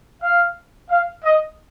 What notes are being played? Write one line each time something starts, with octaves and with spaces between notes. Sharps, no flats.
F5
F5
D#5